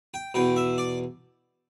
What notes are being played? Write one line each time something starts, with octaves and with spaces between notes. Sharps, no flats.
G5
E2 B2 G5
E5
D5